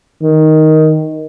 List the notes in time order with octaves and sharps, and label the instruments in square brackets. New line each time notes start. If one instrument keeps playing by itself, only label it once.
[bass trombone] D#3